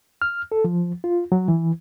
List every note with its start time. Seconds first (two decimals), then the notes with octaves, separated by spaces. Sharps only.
0.22 F6
0.52 A4
0.64 F3
1.04 F4
1.32 F#3
1.48 E3